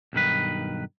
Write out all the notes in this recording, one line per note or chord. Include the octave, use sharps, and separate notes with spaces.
B1 G2 D#3 B4